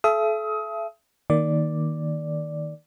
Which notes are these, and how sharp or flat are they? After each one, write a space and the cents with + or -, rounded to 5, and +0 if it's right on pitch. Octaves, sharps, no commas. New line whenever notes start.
A4 -35 E5 +35 D#6 +30
D#3 +5 A#3 +0 D5 +0